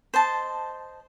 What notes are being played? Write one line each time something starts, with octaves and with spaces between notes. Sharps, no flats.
C5 D#5 A5